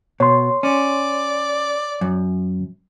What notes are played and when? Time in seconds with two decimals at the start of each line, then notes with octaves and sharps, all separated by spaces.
0.20 B2 C#5 C6
0.63 C#4 D5
2.01 F#2